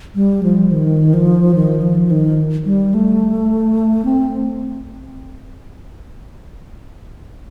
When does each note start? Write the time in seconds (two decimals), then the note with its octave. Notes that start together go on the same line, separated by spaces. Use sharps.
0.15 G3
0.43 F3
0.71 D#3
1.14 F3
1.55 D#3
1.82 F3
2.11 D#3
2.65 G3
2.94 A3
4.05 C4